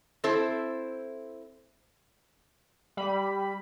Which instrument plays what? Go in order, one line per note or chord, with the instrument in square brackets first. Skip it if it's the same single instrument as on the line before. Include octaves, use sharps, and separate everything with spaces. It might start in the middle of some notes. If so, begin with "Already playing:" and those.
[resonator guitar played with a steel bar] C4 E4 A4 C5
[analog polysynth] G3 B5